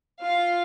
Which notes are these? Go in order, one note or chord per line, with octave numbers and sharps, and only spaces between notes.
F4 F5